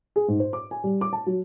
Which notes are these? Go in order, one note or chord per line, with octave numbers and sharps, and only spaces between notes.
G#4
G#2
C5
D6
G#5
G3
D6
A5
F#3